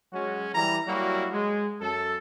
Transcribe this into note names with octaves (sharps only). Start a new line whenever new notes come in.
F#3 G#3 C#4 F#4
E3 G3 A#5
F#3 G3 A#3 E4 F#4
G#3
F#2 A4